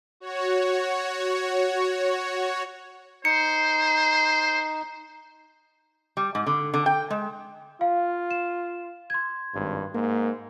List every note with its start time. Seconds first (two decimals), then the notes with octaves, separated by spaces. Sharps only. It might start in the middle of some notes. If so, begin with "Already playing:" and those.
0.20 F#4 C#5
3.25 D#4 C5 C#7
6.17 G3
6.35 G#2
6.46 D3
6.74 D3
6.86 G5
7.10 G#3
7.81 F4 F5
8.31 E7
9.10 C6 G#6
9.55 G#1 G2
9.94 G#2 A#3